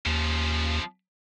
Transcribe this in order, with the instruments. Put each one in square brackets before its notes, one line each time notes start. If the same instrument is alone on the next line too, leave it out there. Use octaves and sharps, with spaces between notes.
[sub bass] D#2 [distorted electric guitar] C#3 F3